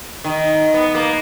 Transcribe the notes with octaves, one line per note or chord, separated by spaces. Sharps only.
D#3
B3
A#3